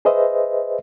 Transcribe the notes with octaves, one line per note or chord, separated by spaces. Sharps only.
G#4 B4 C5 D#5 E5